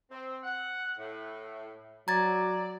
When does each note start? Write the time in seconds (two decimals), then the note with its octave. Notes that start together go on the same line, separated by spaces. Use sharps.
0.11 C4
0.44 F#5
0.99 A2
2.08 F#3 D5 A#5 G#6 A6